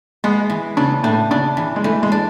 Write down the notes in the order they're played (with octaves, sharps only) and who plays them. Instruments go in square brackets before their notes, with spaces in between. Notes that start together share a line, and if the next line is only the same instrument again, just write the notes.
[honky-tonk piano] G#3 [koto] B3
[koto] E3
[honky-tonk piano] C#3 [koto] D4
[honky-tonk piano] A2 [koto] D4
[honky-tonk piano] C#3 [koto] D4
[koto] E3
[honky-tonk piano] G#3
[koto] E3 [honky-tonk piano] A3
[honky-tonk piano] G#3
[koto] D4